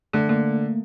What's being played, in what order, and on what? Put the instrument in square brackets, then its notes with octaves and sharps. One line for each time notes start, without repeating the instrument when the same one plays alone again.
[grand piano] D3 [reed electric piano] A3
[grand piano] D3 [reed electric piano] A#3